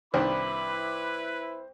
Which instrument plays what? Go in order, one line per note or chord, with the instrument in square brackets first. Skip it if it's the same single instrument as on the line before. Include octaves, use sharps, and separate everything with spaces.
[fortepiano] C2 D#3 D4 [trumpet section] E4 B4 [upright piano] C5 [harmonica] B5 D6